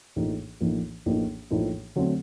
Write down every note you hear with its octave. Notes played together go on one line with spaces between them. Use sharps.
A#1 A2 F3 A#3 D#4
A#1 A2 F3 A#3 D#4
A#1 A2 F3 A#3 D#4
A#1 A2 F3 A#3 D#4
D3 F#3 A3 C4